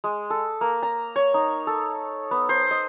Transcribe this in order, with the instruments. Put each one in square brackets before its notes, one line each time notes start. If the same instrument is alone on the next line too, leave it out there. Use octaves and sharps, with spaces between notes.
[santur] G#3
A4
A#3
A#5
C#5
D#4
A4
B3
C5
D#5